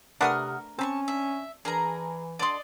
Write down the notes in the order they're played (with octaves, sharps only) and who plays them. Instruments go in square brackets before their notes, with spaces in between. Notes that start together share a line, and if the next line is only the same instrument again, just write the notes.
[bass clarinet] C3 [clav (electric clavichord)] A3 D4 B4 [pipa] A#4 [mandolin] F#5 D#6 F6
[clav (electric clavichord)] C4 [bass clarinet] C#4 [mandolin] A5 B5 C#6
[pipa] D4 [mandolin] E5
[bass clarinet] E3 [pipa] D4 A#4 [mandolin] G#4 A#5
[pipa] D3 C6 [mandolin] D5 D#5